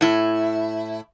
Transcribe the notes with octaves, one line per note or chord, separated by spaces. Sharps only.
A2 E4